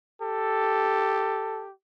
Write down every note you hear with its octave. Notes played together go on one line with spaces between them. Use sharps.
G4 A4